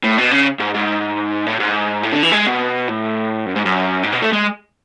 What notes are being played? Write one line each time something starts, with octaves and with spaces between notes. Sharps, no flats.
A2
B2
C#3
G#2
G#2
A2
G#2
A2
D3
E3
G#3
B2
A2
F#2
G#2
F#2
G#2
B2
A3
G#3